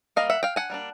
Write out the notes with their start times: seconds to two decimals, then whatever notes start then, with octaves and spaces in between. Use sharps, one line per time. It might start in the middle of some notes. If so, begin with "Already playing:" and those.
0.16 G3 A#3 D#5 F5
0.30 E5 F#5
0.43 F5 G5
0.56 F#5 G#5
0.70 G3 A#3 D4